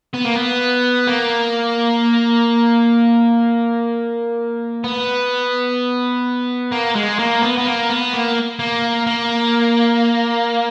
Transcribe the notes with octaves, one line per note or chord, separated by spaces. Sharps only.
B3
A#3
B3
A#3
B3
A#3
G#3
A#3
B3
B3
A#3
B3
A#3
A#3
A#3